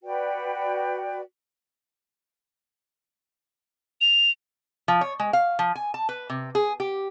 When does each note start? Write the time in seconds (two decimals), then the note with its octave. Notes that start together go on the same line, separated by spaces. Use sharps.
0.04 F#4 B4 D5 G5
4.01 F7
4.88 F3
5.01 C#5
5.19 G#3
5.33 F5
5.59 F3
5.75 G#5
5.94 A5
6.09 B4
6.30 C3
6.55 G#4
6.80 G4